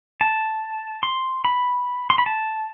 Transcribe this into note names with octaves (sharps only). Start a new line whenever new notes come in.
A5
C6
B5
C6
B5
A5